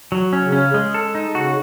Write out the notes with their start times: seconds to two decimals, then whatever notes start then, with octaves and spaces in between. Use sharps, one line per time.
0.12 F#3
0.33 C#4
0.43 C#3
0.52 C#4
0.74 G#3
0.94 A4
1.15 D#4
1.35 C#3 F#4